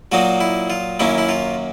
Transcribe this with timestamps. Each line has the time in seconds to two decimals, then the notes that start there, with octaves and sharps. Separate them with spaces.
0.12 A#2 F#3 A#3 D#4 F#4
0.41 E4
0.70 F4
1.00 F#2 D#3 F#3 A#3 C#4 E4
1.18 E4
1.29 F4